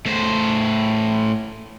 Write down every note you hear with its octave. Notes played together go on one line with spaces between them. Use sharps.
A2 C5